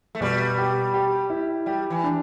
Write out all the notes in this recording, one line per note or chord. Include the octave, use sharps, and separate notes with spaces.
A3
B2 G3
G4
G4
E4
G3 G4
E3
D4